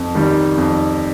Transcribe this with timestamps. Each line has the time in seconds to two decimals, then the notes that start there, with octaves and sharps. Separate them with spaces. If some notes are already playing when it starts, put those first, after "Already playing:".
Already playing: F2
0.15 D#3 G3
0.58 F2